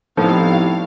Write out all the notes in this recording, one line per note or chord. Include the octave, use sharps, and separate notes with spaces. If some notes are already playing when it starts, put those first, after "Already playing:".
A2 F3 G3 B3 C4 D#4 F5